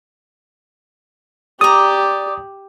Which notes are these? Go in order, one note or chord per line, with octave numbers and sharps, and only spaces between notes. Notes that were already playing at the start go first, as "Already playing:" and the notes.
G4 D5 A#5 D#6